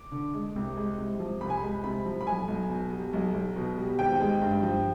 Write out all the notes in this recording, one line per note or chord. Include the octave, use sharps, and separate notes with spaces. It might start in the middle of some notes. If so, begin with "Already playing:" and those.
Already playing: D6
D3
G#3
C2
G#3
C3
F3
C2 B5
G#5
G#3 B5
C3 B5
F3
B5
B1 G#5
B1
B2
G3
B1
B1
B2
G3
G#1 G5
G#3
G2
F3